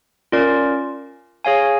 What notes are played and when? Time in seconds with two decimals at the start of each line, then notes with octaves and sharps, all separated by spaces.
0.32 C#4 F4 A#4 D5
1.45 G#4 C#5 F5 G#5